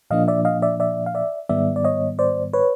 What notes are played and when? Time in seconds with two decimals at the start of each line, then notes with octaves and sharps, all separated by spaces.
0.10 A#2 F3 A#3 D4 D#5 F5
0.28 D5 E5
0.45 D#5 F5
0.62 D5 E5
0.80 D5 E5
1.06 F5
1.15 D5 E5
1.49 G#2 D#3 G3 B3 D5 E5
1.76 D5
1.84 C#5 D#5
2.19 C5 D5
2.53 B4 C#5